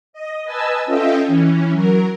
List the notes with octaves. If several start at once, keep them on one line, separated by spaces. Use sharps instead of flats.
D#5
B4 D#5 G#5 A5 E6
C#4 F4 A4 D#5 E5 G5
E3 C#4
F#3 A#4